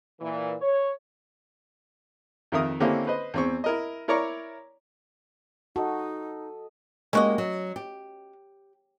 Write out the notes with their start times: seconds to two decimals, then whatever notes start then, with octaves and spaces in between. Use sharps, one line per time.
0.21 A#2 E3
0.61 C#5
2.52 F2 D#3 A#4 E5 D#6
2.80 D3 A#3 C4 C#4 E4 G4
3.07 B4 C5 D#5
3.34 E2 C4 C#6
3.64 E4 A#4 D#5
4.08 E4 A#4 C#5 D5 A#5 C#6
5.76 D#4 F#4 A4 D#5
7.13 G#3 A#3 C#4 F#4 G4 D#5
7.38 F#3
7.76 G4